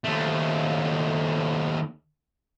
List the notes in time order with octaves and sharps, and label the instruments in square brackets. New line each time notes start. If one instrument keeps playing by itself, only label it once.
[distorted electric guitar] D#2 A3